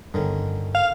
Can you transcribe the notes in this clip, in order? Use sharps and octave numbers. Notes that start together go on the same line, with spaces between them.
G1 G2 D3 D#3 C#4
F5